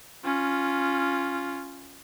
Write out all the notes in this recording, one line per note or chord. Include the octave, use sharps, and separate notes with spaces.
C#4 F4